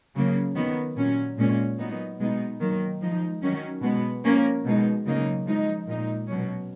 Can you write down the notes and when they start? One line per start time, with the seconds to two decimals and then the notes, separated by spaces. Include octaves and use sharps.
0.15 C#3 F#3 A#3
0.55 D#3 F#3 B3
0.96 A#2 F#3 C#4
1.38 A#2 G#3 C#4
1.78 A#2 F#3 B3 D#4
2.20 B2 G#3 B3 D#4
2.60 D#3 F#3 A#3
3.01 F3 G#3 D#4
3.42 D#3 F#3 C#4
3.82 B2 G#3 B3
4.23 F3 A#3 C#4
4.65 B2 G#3 D#4
5.05 C#3 F#3 A#3 D#4
5.46 F3 G#3 D#4
5.87 A#2 G#3 D#4
6.28 B2 F#3 C#4